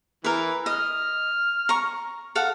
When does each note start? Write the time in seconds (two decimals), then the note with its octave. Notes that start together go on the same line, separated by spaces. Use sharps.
0.24 E3 A#4 B4
0.66 D#5 F6
1.69 A#5 C#6
2.35 A4 F5 F#5